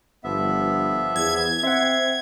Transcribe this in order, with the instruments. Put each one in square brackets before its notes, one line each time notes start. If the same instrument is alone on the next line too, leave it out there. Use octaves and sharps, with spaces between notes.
[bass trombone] G1 [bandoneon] F3 B3 E5
[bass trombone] E2 [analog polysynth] G#6
[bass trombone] C4 [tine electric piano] E5 F#5 [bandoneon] C6